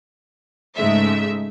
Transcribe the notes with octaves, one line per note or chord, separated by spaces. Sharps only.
G#2 C#3 G#3 A3 E5